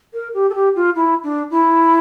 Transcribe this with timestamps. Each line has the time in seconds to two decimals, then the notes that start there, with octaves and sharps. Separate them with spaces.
0.13 A#4
0.34 G4
0.49 A4
0.54 G4
0.75 F4
0.95 E4
1.23 D4
1.50 E4